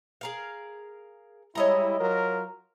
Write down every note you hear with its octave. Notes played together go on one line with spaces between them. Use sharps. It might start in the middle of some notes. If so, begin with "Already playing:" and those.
G#4 A#4 F5
G3 G#3 E4 C#5 D#5 A#5
F#3 F4 A#4